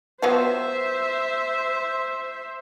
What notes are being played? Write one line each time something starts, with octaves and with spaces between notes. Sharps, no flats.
F#3 B3 F4 C5 E5